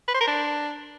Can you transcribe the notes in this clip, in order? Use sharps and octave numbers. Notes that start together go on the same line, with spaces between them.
B4
C5
A#4
D4